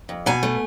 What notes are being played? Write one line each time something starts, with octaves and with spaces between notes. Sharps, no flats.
F2
B2 G#5
A3